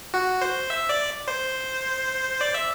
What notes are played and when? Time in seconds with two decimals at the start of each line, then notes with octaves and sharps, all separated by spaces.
0.14 F#4
0.41 C5
0.70 E5
0.89 D5
1.28 C5
2.41 D5
2.54 E5